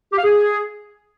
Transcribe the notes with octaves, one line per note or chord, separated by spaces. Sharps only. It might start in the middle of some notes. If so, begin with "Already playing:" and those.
G4
F5
G#4